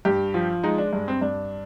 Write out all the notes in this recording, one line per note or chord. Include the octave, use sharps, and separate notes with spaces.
G2 G4
F3
G#3 D#4
D4
G2 D4
C4
G2 D4